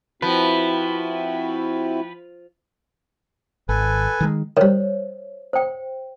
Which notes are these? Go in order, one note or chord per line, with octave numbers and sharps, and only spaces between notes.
F3 C4 E4 F#4 B4
G#1 A4 B4 G#5
D#3 E3 G#3
D#3 G3 C5 C#5
C5 G5